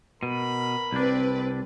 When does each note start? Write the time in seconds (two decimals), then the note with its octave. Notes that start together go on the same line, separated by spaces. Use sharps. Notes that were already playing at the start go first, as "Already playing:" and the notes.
0.23 B2 A#4 B5
0.93 C2 C4 D4 B4 D5